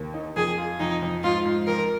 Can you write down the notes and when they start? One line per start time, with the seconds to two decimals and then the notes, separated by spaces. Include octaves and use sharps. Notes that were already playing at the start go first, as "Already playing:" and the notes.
Already playing: D#2
0.14 D#4
0.36 F2 G#4
0.58 F4
0.80 F2 D#4
1.02 F2
1.23 G#2 F4
1.45 G#2
1.67 F2 A#4